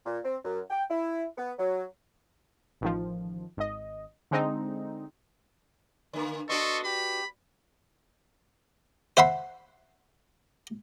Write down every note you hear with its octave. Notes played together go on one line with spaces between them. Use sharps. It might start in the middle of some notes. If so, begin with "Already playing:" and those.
A#2
C4
F#2
G5
E4
B3
F#3
A1 D#3 F3
G#1 D#5
D3 G#3 C4 D#4
D3 A#3
B3 D4 F#4 A4 D#5 C6 C#6
G4 B5
C5 E5 F#5 B5 C6